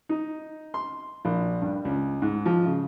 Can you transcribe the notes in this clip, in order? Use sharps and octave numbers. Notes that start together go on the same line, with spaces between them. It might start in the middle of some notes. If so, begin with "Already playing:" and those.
D#4
C6
A#1
G2
C#2
G#2
F3
C#3